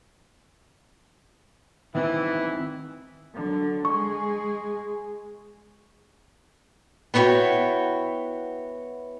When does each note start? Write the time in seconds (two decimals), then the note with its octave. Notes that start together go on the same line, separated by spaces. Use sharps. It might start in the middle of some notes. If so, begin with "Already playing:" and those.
1.95 D#3 E3 C4 E4
3.35 D3 F#3
3.85 G#3 G#4 C#6
7.14 B3 E4 F#4 C#5 G5